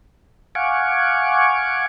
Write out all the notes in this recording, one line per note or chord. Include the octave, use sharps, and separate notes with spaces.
F5 F#5 G#5 C#6 D6